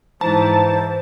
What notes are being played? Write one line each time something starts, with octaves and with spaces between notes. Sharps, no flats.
G#2 E3 C5 A5 A#5